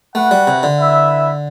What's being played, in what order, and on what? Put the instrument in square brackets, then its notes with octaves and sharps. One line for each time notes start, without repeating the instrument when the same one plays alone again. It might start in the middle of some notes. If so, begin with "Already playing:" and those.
[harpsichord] A3 [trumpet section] F#4 B4 F#5
[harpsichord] G3
C3
D3
[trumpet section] E4 B4 E5